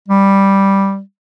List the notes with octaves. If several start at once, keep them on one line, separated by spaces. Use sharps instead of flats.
G3